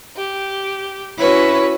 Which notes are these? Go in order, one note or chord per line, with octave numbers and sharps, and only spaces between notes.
G4
C#4 E4 F#4 B4 C#5